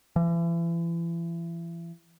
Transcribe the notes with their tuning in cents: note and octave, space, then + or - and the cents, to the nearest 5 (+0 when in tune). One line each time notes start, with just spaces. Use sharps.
E3 +35